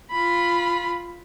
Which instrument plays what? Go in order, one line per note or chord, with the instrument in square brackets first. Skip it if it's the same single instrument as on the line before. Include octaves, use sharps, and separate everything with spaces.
[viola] F4 B5